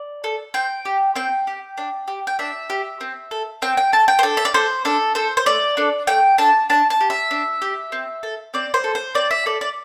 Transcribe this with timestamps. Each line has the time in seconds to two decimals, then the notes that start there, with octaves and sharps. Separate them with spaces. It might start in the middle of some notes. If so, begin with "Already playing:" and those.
Already playing: D5
0.24 A4
0.54 C4 G5
0.85 G4
1.15 C4 G5
1.47 G4
1.78 D4
2.08 G4
2.27 G5
2.39 D4 E5
2.70 G4
3.01 C4
3.31 A4
3.62 C4 G5
3.77 G5
3.93 A4 A5
4.08 G5
4.19 C5
4.23 D4 A4
4.37 E5
4.45 D5
4.54 A4 C5
4.85 D4 A4
5.15 A4 C5
5.37 C5
5.46 A3 D5
5.77 D4 A4
6.07 A3 G5
6.38 D4 A4 A5
6.70 D4 A5
6.90 A5
7.01 G4
7.10 E5
7.31 D4
7.62 G4
7.92 C4
8.23 A4
8.54 C4 D5
8.74 C5
8.84 A4
8.95 C5
9.15 C4 D5
9.31 E5
9.46 A4 D5
9.61 D5